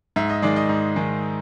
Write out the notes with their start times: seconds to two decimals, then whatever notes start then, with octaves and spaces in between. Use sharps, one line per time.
0.16 G#2 E5
0.30 D#5
0.42 D#3 G#3 D5
0.56 D#5
0.69 G#2
0.96 D#3 G#3